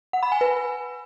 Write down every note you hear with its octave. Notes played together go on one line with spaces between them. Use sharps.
F#5
B5
G#5
B4